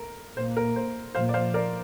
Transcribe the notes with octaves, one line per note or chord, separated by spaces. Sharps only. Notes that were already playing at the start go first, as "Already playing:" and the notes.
Already playing: A#4
A#2 A#3 C5
A#4
C5
A#2 F3 A#3 C5 F5
D5
C5 F5
A#4 D5